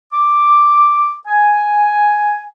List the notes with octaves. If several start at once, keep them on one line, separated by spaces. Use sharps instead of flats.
D6
G#5